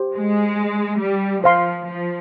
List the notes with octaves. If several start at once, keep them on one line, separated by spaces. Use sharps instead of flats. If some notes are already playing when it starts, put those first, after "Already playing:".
Already playing: G4 C5
G#3
G3
F3 C5 F5 C6
F3